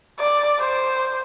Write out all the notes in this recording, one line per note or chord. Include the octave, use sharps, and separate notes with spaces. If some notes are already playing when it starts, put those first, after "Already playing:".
D5
C5